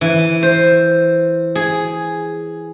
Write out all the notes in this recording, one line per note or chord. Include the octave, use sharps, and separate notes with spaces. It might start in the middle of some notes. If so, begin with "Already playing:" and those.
E3
C5
G#4